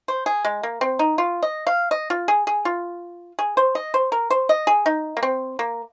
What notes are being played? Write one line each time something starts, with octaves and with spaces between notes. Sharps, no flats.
C5
G#4
G#3
A#3
C4
D#4
F4
D#5
F5
D#5
F4
G#4
G#4
F4
G#4
C5
D#5
C5
A#4
C5
D#5
G#4
D#4
A#3
C4
A#3